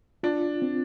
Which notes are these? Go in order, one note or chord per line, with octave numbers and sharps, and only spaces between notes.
D4 F4
C4